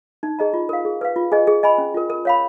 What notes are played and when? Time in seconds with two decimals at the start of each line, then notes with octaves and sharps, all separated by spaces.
0.23 D#4
0.39 G#4 D#5 A#5
0.54 F4
0.69 A#4 F5
0.85 G#4
1.01 B4 F5
1.16 F4
1.32 G#4 D#5 G#5
1.47 G#4
1.63 D#5 G#5 B5
1.78 C#4
1.94 F4 A#4
2.10 A#4
2.25 C#5 F5 B5